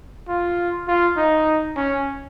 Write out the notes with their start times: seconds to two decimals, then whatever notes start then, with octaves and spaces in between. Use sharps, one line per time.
0.28 F4
0.88 F4
1.17 D#4
1.76 C#4